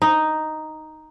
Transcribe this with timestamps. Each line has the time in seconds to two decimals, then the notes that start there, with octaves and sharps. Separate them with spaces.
0.02 D#4